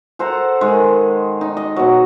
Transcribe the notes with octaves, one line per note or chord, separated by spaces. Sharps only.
A4 C5 F#5 A#5
D#3 G#3
D#4
D#5
B2 F#3